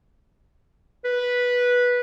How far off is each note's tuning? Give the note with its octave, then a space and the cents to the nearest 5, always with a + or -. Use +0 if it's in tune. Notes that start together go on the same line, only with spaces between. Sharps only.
B4 -10